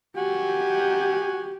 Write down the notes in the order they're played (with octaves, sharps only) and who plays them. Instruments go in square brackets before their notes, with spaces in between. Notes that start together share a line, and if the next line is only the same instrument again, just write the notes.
[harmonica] F#4 F#5 G#5 [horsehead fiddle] G4